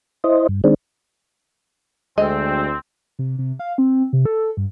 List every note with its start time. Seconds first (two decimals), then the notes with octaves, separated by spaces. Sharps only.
0.24 E4 C5 D#5
0.49 G2
0.64 D#3 G#3 C4 D4
2.18 D2 G#3 C4 D#5
3.19 C3
3.39 C3
3.59 F5
3.78 C4
4.13 C3
4.25 A4
4.57 G2